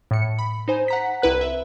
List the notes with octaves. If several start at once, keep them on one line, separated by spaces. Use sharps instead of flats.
A2 C#7
B5
D#4 C5 G#5
F#5 A#5 B6
C2 E4 B4 F#6
E5